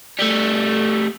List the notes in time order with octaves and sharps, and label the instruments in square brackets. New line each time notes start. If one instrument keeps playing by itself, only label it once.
[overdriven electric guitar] G3 A3